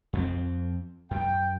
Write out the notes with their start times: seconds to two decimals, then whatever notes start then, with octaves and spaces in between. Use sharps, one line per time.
0.13 F2 A#3 C4
1.11 F#2 G5